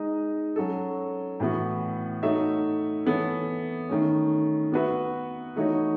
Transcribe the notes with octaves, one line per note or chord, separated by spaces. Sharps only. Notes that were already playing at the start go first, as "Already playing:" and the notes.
Already playing: G#3 D#4 G#4 D#5
F#3 C#4 F#4 A4
A2 E3 B3 F#4
A3 D#4 F#4 C#5 E5
E3 B3 E4 A4 C#5
D#3 A3 C#4
B3 F#4 B4 E5
E3 A3 D#4 F#4 C#5